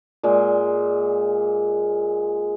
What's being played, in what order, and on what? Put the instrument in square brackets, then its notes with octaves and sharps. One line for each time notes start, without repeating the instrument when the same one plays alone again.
[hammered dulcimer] A#2 G#3